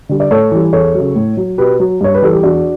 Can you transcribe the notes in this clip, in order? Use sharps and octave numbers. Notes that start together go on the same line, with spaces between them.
D3 G3
D5
A2 A4 C#5
E3 G3
E2 A4 C#5
C#3 F#3
A2
F#3
B2 G4 B4
F#3
G2 C#5
B4
E3 G3 A4
G4
E2 D4 F#4